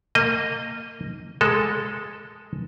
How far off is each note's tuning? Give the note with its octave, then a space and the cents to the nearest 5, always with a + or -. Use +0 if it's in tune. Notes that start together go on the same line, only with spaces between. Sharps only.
A#3 -25 D#5 -5
G#3 +0 A4 +0